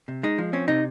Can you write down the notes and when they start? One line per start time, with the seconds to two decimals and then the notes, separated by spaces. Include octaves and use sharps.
0.08 C3
0.23 G#3 D#4
0.38 F3
0.53 C4 C#4
0.68 C3 D#4